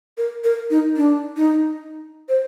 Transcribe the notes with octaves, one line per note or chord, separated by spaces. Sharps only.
A#4
A#4
D#4
D4
D#4
C5